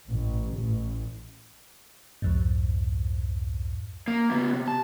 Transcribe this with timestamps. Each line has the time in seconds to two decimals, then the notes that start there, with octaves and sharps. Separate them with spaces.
0.10 A1
0.57 A1
2.22 C2 F2 G#2
4.08 A#3
4.31 C#3 B3
4.53 C3
4.68 A5